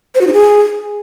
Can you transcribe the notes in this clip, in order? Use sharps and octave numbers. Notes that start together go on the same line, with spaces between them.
C5
F#4
D#4
G#4